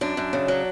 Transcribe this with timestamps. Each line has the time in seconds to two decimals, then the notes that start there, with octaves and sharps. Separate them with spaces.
0.01 F#2 D4
0.17 F#2
0.33 C#3
0.48 F#3